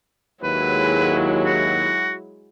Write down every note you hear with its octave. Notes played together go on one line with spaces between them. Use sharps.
D#2 F#3 G#3 E4 B4
F#4